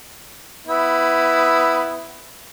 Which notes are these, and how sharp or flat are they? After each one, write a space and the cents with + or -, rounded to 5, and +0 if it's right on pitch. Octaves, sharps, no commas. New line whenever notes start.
B3 +15 E4 +0